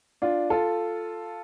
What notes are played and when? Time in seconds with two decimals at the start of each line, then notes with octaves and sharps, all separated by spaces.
0.22 D4 F4
0.50 F4 A4